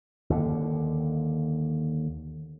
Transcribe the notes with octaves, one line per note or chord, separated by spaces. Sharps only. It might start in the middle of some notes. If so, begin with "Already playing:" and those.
D#2 D3